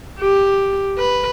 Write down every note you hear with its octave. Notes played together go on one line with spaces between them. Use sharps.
G4
B4